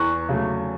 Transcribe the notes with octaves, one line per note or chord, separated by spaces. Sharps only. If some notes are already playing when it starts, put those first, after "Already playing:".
Already playing: E2 C#6 F#6
C#3 F#3 A3